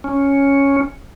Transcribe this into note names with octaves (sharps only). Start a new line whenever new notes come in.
C#4